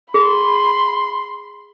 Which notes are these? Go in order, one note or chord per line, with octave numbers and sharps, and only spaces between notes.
G#4 B5 C6